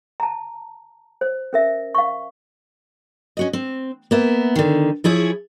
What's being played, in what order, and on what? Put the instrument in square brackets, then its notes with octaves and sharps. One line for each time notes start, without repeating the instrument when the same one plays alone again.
[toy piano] A5 A#5
C5
C#4 A#4 E5
F5 C#6
[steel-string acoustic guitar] C#4 F#4 D#5
C4
A#3 B3 E5
D3 D#3
F3 E4 G#4 C#5